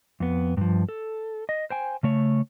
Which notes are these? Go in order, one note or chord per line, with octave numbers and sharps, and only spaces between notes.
F2 B3
G2 F3
A4
D#5
C5 G5 G#5
C#3 A3 C#5